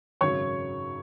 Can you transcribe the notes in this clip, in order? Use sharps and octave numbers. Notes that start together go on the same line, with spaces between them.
G#1 F#2 C#3 F#3 C#5 C#6